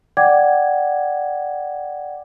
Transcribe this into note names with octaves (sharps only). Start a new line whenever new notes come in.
D5 F#5 G5 D6 G#6